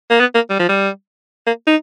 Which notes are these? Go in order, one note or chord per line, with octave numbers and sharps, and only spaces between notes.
A#3
B3
A#3
G3
F3
G3
A#3
D#4